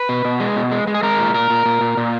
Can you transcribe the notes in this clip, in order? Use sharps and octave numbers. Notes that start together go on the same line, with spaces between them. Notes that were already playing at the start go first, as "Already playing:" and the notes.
Already playing: B4
B2
B2
G#3
B2
G#3
G#3
G#4
G#3 A#4
A#2
A#2 A#4
A#2
A#2
A#2
A#2